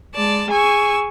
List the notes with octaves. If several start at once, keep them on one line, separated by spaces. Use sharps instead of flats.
G#3 D5 A5
G#4 G#5 C#6 E6